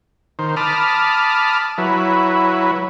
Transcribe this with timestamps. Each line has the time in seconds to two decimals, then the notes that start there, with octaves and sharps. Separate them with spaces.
0.39 D#3 C5
0.56 A5 B5 D6 D#6 F6
1.78 F#3 E4 B4